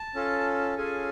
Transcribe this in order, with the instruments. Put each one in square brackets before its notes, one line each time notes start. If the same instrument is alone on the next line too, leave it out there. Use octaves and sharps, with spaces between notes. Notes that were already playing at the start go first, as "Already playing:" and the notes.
Already playing: [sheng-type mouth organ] A5
C#4 F4 A4
C#4 F4 G#4 A4 G#5